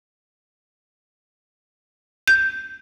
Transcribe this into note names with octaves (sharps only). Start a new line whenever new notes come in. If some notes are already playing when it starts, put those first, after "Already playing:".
G6